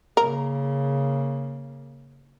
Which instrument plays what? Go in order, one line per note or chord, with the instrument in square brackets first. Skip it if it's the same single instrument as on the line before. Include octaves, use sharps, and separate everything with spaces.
[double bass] C#3 A#3 [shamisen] A#4